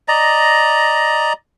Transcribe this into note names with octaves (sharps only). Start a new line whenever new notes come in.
D5 D#5 A#5